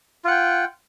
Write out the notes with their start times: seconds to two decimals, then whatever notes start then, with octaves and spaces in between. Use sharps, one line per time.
0.24 F4
0.28 F#5
0.31 G5